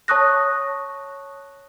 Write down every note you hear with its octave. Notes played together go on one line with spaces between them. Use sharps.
C#5 A5 C#6 D#6 F#6 A#6